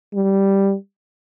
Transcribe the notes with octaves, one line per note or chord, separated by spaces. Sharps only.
G3